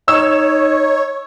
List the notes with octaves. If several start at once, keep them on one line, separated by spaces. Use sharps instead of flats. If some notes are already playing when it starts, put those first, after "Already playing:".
D#4 C#5 E6